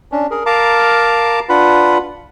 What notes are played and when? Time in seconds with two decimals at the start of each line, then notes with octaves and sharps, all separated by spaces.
0.12 C#4 D4
0.31 G#4 A#4
0.46 A#4 F5 A5 A#5 D6
1.49 D4 F4 B4 F#5 B5